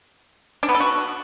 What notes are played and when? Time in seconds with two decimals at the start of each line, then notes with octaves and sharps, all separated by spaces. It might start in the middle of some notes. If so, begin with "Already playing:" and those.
0.63 D4
0.69 B3
0.75 A4
0.80 F#4